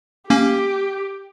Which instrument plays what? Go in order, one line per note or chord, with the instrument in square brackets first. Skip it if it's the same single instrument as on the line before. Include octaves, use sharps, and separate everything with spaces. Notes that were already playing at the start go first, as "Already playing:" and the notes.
[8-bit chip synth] A#3 C#4 [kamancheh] G4